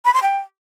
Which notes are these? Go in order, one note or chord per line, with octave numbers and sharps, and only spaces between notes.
B5
C6
G5